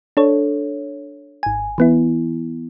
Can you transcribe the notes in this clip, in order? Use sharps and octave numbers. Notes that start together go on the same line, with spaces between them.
D4 A4 C#5
G#1 G#5
E3 B3 E4